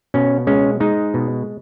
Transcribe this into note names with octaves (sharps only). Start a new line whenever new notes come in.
B2 C#4
G#3 C#4
G#3 D#4
B2